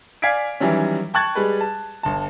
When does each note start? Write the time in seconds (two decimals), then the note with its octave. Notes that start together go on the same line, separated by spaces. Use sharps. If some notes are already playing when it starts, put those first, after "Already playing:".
0.22 D5 F5 G#5 G#6 B6 D7
0.60 D#3 E3 F#3 G3 C#4
1.14 G5 A5 C#6 F#6 G#6 A6
1.35 G3 G#3 B4
1.61 A5
2.03 G1 A5